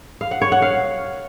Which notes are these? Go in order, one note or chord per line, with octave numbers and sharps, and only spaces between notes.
F5
F#5
C#5
F#5
F5